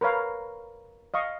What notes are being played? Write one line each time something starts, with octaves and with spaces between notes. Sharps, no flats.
A#4 B4 C#5 F5
D#5 F5 C#6